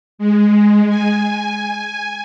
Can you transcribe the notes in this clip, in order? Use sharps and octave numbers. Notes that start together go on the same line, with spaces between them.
G#3
G#5